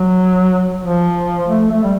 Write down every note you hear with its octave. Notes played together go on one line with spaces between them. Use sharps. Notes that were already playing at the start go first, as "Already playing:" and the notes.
Already playing: F#3
F3
A3
A3
G3